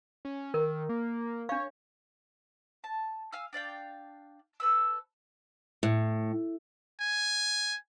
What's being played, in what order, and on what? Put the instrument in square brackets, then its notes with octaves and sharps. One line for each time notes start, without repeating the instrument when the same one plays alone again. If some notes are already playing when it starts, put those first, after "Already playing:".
[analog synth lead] C#4
[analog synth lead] D#3 [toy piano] A#4
[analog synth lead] A#3
[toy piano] D4 F5 [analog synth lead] C#5
[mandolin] A5
F5 G#5 E6 F6
D4 D5 F5 G5
A4 B4 E6
[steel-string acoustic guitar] A2
[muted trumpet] G#5